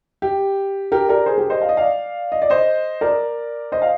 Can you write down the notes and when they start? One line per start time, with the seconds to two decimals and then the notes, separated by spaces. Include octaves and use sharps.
0.22 G4
0.92 G4 A#4
1.09 A#4 D5
1.26 G#4 C5
1.38 G4 A#4
1.50 C5 D#5
1.62 F5
1.69 D#5
1.77 D5 F5
2.32 D#5
2.42 D5
2.50 C5 D#5
3.01 A#4 D5
3.72 C5 D#5
3.82 F5